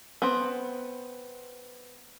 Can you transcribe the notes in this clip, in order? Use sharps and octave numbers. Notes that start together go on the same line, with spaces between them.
B3 C4